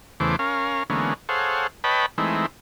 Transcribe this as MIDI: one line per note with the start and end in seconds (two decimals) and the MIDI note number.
0.20 0.36 40
0.20 0.36 49
0.20 0.36 52
0.20 0.36 57
0.20 0.36 72
0.20 0.36 86
0.39 0.83 61
0.39 0.83 70
0.39 0.83 77
0.90 1.14 50
0.90 1.14 52
0.90 1.14 56
0.90 1.14 58
0.90 1.14 59
0.90 1.14 61
1.29 1.67 68
1.29 1.67 69
1.29 1.67 72
1.29 1.67 73
1.29 1.67 77
1.29 1.67 78
1.84 2.06 71
1.84 2.06 73
1.84 2.06 75
1.84 2.06 79
1.84 2.06 81
1.84 2.06 83
2.18 2.46 52
2.18 2.46 56
2.18 2.46 57
2.18 2.46 60
2.18 2.46 63
2.18 2.46 64